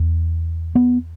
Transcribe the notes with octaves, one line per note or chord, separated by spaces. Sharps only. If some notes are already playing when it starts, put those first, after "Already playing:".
Already playing: E2
B3